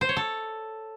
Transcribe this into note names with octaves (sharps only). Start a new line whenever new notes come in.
C5
C#5
A4